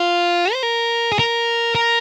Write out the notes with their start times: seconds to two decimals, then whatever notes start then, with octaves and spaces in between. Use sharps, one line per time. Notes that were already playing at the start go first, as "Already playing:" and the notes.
Already playing: F4
0.53 C5
0.63 A#4
1.12 G#4
1.19 A#4
1.75 A#4